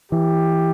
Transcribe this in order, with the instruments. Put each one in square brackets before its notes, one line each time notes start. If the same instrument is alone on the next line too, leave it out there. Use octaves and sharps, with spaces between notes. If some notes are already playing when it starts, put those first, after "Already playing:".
[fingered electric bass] E3 [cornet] G4